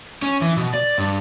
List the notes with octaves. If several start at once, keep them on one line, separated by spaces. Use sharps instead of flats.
C#4
E3
B2
D5
G2